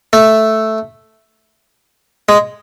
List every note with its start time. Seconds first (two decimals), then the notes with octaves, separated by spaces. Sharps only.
0.13 A3
2.29 G#3